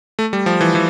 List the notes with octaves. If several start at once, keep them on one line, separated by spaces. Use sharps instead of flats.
A3
G3
F3
E3
E3